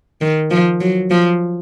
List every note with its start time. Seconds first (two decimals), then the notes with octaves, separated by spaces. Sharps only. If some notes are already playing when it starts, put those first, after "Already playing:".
0.21 D#3
0.51 F3
0.81 F#3
1.10 F3